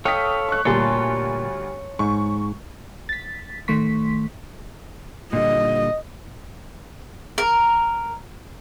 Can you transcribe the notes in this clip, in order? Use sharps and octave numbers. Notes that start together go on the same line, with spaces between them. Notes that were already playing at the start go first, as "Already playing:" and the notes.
A4 C#5 F5 G5 D#6 B6
C#6 F#6
D2 A#2 G3 C#5 A5 C6
G#2 C#6
A6 B6
A1 D#3 A3 C6 C#6 B6
A#2 D3 G3 D#5
A#4